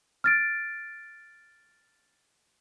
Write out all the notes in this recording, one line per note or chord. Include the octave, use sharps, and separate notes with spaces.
F6 A6 D7